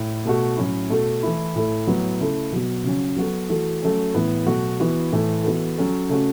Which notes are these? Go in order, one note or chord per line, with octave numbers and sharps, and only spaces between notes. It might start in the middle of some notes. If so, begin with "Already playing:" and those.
Already playing: A2
B2 A3 F#4
A2 F#3 C#4 E4
B2 A3 F#4 A4
E3 A3 E4
A2 A3 E4 A4
A2 F#3 B3
C#3 A3 E4 A4
B2 F#3 B3 F#4
C#3 F#3 C#4
F#3 B3 F#4 A4
E3 A3 F#4 A4
F#3 A3 C#4 A4
A2 E3 B3
B2 F#3 A3 F#4
E3 B3 F#4
A2 E3 A3
E3 B3 F#4 A4
F#3 C#4 A4
C#3 A3 C#4 F#4